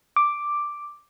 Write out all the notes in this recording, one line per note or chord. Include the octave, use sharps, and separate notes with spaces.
D6